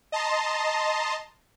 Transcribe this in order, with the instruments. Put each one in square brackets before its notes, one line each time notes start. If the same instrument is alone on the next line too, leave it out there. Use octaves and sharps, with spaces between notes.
[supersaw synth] D#5 A5 A#5 C6